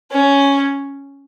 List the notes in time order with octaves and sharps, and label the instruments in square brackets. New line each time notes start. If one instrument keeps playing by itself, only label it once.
[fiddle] C#4